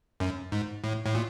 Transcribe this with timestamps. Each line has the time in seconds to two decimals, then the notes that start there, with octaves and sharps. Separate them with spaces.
0.20 F#2
0.52 G#2
0.84 A2
1.06 A2
1.15 A#2